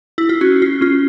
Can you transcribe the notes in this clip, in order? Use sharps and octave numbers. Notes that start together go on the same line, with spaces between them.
E4
F4
C#4 F#4
F4
C#4 F4